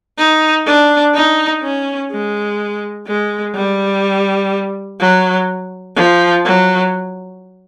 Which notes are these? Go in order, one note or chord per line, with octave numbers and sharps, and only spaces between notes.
D#4
D4
D#4
C#4
G#3
G#3
G3
F#3
F3
F#3